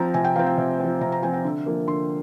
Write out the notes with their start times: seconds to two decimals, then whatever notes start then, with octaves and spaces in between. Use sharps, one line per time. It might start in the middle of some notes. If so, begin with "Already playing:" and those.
Already playing: F3 C4 A#5
0.14 C3 G#5
0.24 G5
0.36 F3 C4 F5
0.46 G5
0.58 C3
0.80 F3 C4
1.01 C3 A#5
1.12 A#5
1.23 F3 C4 G#5
1.33 G5
1.44 D3
1.66 F3 A#3
1.88 D3 C6